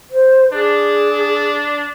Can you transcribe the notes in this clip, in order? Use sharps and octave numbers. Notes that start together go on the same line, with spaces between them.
C5
D4 G#4